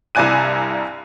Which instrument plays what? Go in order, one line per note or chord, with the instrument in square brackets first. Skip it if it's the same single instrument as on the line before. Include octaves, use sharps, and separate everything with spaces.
[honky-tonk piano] C2 G2 D5 G#5 F#6 D#7